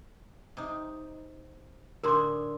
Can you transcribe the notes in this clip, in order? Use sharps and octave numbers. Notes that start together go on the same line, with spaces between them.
C3 D#4
A2 D3 G#4 A#4 C6 D6